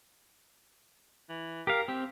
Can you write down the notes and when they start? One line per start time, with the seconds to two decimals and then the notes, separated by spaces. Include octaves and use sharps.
1.30 E3
1.67 G4 A#4 F5
1.88 C4 G4